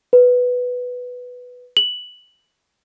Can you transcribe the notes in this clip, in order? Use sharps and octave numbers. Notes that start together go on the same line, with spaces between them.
B4
F#7